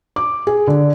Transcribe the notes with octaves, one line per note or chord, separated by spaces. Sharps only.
D6
G#4
D3